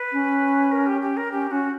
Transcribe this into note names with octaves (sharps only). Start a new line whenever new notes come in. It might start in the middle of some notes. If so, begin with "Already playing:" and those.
Already playing: B4
C#4
A#4
G4
G4
A#4
C#4 G4
C#4 F#4